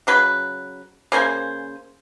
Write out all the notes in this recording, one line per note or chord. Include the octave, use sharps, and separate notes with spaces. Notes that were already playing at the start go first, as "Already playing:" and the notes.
C#3 F#3 B4
C#3 A#3 C5 G#5